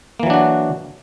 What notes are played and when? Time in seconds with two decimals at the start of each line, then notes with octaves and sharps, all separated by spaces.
0.20 A#3
0.23 E3
0.27 F#3
0.30 D4
0.34 F#4